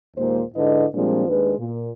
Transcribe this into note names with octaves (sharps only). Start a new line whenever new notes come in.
D#2 A#2 G#3 A#3 C5
G#2 D3 E4 B4 D#5
A#2 F3 G3 G#3 C4 D4
D#2 G#3 D4 B4
A#2